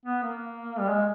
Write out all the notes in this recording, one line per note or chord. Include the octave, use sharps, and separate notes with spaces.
B3
A#3
G3
G#3